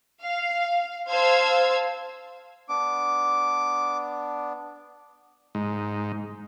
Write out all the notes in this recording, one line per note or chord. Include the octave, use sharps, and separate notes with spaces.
F5
C5 F5 A5 E6 G#6
B3 D4 D6
G#2